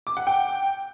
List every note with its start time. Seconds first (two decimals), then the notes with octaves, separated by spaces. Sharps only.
0.07 D6
0.17 F#5
0.27 G5